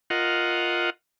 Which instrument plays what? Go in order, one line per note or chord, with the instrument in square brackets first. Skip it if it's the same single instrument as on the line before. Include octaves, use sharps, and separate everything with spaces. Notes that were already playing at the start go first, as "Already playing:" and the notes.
[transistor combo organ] F4 A#4 D#5 F#5